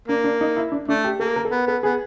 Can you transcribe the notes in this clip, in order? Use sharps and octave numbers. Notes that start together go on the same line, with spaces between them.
A#3 D4
D4
D#4
E4
D4
A3 D4
G4
A#3 A4
A#4
A4
B3 A#4
B3 A4
B3 G#4